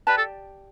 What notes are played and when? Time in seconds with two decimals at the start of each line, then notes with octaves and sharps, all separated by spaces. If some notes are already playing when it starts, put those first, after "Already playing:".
0.07 G4 B4 D5 A5
0.18 A4